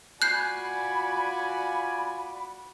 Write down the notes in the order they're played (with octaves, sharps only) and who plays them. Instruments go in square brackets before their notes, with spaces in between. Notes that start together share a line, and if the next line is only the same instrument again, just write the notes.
[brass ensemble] F4 G#5 [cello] F#4 D5 [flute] B5 [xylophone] F#6 G6 C7